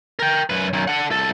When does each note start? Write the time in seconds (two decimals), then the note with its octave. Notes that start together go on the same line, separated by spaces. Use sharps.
0.19 A#4 G5
0.50 F#2 B4
0.73 F#2 D#3
0.88 A4 F#5
1.11 C2 A4